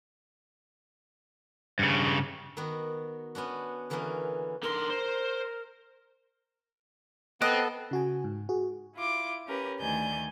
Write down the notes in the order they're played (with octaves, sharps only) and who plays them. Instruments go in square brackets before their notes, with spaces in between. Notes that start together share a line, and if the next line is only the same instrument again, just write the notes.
[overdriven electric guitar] G2 C#3
[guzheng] D#3 B3 F#4
B3 C#4 D4 F#4
D3 E3 A#3 B3 C#4
[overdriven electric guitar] D3 C6 [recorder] A#4
[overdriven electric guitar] C5
[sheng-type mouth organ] B3 A4 [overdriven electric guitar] C4 [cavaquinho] D#5 [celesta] D#6 F#6
[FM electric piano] C#3 F#4 G#5
G#2
F#4 G#4
[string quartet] E4 F4 D6
C#4 G4 A#4 B4
D2 D#3 D5 G#5 G6